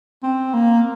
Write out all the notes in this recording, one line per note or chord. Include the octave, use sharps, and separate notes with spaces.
C4
A#3